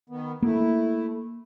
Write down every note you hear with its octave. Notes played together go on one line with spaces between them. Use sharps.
D#3 B3
A3 A#3 E4